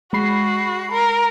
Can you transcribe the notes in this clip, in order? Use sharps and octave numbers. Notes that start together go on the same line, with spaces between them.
G#3 F#4 B5 C7
A#4